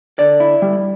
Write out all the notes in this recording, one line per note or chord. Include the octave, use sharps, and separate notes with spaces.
D3 D5
E4
G3